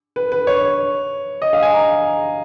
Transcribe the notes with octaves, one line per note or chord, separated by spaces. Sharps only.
B4
B4
C#5
D#5
F5
G#5
A#5